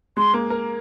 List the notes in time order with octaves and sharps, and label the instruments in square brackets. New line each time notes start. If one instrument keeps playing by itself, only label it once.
[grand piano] G#3 [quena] C6
[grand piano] A#3
A#4